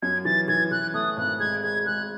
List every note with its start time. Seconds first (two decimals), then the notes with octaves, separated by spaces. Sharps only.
0.02 F#2 G#6
0.25 E3 A6
0.48 E3 G#6
0.71 E3 F#6
0.94 A3 D#6
1.17 G#1 F#6
1.40 G#3 G#6
1.63 G#3 G#6
1.86 G#3 F#6